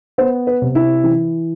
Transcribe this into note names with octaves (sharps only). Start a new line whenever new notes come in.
B3 C5
B4
C3
E4
E3